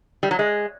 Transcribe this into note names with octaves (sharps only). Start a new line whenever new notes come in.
G3
F#3
G#3